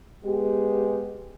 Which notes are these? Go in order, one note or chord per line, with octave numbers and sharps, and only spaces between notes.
G#3 B3 G4